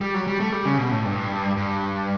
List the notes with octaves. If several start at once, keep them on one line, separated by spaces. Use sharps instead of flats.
G3
F#3
G3
A3
G3
C#3
B2
A2
G2
G2